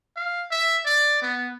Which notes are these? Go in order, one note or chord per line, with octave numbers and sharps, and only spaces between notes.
F5
E5
D5
B3